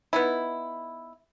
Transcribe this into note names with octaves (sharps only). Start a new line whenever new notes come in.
B3 D#4 E4